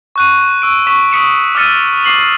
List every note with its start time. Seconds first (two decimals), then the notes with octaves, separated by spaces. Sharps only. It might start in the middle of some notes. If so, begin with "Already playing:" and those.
0.16 C#6 F#6 D#7
0.62 C#6 E6 D7
0.87 C#6 B6 E7
1.12 C#6 D#6 B6 C#7 E7
1.55 D6 E6 F6 A6 C#7 D#7
2.04 D6 C7 F#7